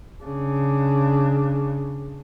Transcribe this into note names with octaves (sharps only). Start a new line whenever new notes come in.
C#3 D4